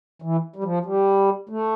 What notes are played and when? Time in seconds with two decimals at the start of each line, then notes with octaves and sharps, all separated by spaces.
0.22 E3
0.56 G3
0.64 F3
0.85 G3
1.49 A3